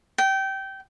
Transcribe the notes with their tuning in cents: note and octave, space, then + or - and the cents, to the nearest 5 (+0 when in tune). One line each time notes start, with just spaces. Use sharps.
G5 -20